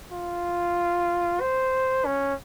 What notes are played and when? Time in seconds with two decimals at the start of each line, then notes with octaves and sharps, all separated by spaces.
0.12 F4
1.41 C5
2.05 C#4